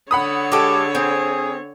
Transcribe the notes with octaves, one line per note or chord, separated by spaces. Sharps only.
D3 C#5 F#5 B5 D#6
G#3 G4 A4 D6
C4 G#4